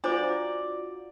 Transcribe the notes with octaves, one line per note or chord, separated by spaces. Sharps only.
D4 F4 F#4 C5 D5 A#5 D6